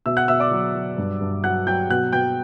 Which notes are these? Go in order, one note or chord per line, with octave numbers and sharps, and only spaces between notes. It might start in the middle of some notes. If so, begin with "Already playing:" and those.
B2 E5 E6
F#5 F#6
B2 E5 E6
D5 D6
F#3
F#3
G2
G2
F#3 F#5 F#6
F#3 G5 G6
B2 F#5 F#6
B2 G5 G6